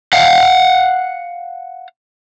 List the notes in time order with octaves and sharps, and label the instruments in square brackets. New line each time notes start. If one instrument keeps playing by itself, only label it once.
[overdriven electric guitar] F5 F#5